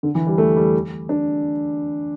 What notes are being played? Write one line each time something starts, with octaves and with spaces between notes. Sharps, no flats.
D3
E3
G3
A3
G3
D4